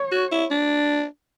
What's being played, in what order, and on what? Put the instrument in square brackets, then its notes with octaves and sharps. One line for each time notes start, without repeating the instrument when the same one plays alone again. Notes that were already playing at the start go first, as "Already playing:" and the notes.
Already playing: [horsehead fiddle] C#5
[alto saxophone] F#4
E4
D4